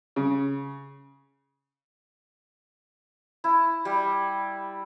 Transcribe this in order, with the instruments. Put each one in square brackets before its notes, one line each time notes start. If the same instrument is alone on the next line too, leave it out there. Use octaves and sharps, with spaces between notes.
[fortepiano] C#3
[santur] E4
G3